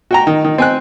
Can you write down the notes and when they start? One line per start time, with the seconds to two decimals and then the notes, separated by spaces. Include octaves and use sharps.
0.11 F#4 G5 A#5
0.27 D#3
0.44 D#3
0.58 C4 G#5 F#6